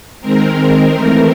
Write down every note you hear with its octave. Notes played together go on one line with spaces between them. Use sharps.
D#3 G#3 C4 A#4
A#4
E3 A3 C4